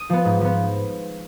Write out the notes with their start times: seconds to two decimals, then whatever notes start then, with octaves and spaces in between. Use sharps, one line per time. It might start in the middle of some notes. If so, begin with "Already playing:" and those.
Already playing: D#6
0.10 F3 B3
0.25 G#2
0.41 F3 B3